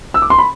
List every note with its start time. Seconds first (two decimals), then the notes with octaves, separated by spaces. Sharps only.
0.14 E6
0.22 D6
0.30 C6
0.39 B5